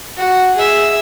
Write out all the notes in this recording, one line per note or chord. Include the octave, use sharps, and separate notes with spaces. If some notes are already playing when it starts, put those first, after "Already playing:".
F#4
G#4 E5